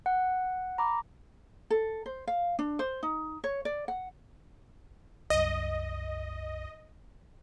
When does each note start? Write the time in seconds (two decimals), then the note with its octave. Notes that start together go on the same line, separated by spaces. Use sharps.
0.06 F#5
0.78 A#5 B5 D6
1.70 A4
2.06 C5
2.27 F5
2.59 D4
2.79 C5
3.03 D#4
3.44 C#5
3.65 D5
3.88 F#5
5.30 C2 F#2 D#5